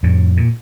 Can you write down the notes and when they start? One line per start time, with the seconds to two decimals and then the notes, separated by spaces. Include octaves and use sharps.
0.03 F2 A2
0.37 A#2